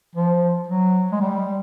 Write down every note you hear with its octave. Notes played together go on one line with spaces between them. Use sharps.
F3
F#3
G#3
G3